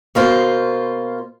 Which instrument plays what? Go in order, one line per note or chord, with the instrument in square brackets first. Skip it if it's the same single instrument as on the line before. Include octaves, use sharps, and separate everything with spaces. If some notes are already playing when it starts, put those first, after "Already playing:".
[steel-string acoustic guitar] B2 A#3 F4 C5